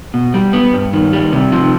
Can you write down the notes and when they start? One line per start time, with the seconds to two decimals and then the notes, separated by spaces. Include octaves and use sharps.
0.14 B2
0.34 G3
0.53 B3
0.74 G2
0.93 D#3
1.13 G3
1.33 C3
1.52 F3